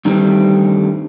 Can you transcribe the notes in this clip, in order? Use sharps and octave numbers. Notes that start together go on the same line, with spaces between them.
G2 D#3 E3 G3 A3 C4